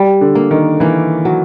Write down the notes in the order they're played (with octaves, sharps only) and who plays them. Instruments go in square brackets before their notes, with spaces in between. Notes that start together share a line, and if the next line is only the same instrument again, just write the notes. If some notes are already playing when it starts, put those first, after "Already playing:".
Already playing: [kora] G3
[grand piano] D3
[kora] A#3
[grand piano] D#3
[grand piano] E3 [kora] A#3
[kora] F#3